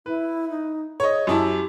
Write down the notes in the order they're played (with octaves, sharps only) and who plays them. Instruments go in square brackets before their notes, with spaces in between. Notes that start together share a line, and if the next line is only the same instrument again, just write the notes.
[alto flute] E4 [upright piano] B4
[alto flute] D#4
[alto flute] G#4 [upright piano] C#5 D#5
[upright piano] F#2 E4 A5 [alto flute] G4